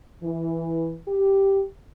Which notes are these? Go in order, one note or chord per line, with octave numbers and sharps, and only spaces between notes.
E3
G4